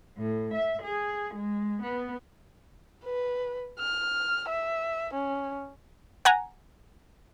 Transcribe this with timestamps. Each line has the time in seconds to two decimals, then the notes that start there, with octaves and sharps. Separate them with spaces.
0.17 A2
0.54 E5
0.83 G#4
1.35 G#3
1.83 B3
3.04 B4
3.79 F6
4.49 E5
5.13 C#4
6.25 F#5 G#5 A#5